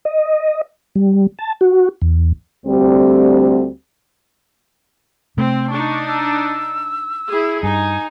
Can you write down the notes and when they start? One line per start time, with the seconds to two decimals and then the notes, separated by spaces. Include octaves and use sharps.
0.05 D#5
0.95 G3
1.39 A5
1.61 F#4
2.02 E2
2.66 D2 G3 C4
5.37 C3 A3 C4
5.71 D4 D#4 C#6
6.08 E6
7.28 E4 G#4
7.63 G2 D#4 G#5